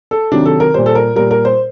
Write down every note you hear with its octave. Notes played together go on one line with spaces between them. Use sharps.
A4
C3 D#3 F#3 D4
A4
A#4
A#2 G3 C5
A4
A#4
A#2 G3 A#4
A#4
C5